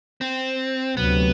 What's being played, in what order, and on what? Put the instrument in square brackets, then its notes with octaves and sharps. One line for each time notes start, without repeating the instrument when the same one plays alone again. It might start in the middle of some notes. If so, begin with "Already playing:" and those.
[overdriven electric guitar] C4
[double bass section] D2 C3 F#3 [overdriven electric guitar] B3